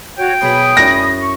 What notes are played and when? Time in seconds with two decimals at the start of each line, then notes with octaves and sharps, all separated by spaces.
0.18 F#4 C#5 G5
0.41 B2 F#3 G#4 B5 C6 D#6
0.77 F#2 E4 A#6
1.20 C#6